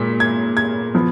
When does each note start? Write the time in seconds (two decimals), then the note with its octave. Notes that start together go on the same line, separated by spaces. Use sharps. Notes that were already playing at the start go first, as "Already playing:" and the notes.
Already playing: A#2 G#3 B6
0.20 G#6
0.57 G#6
0.95 F3 B3